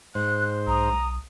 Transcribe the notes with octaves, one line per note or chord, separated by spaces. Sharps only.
G#2 C5 F#6
B1 A#5 D#6